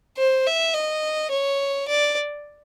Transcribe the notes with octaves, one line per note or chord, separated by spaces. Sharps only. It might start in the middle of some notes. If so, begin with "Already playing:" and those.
C5
E5
D#5
C#5
D5